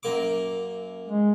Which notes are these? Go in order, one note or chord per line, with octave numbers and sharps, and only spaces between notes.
F#2 A#3 D6
G#3